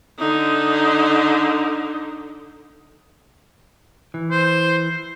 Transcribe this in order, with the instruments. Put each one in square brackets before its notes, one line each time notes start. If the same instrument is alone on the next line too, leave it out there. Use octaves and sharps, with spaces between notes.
[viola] D3 D#4
[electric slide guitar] E3
[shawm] C5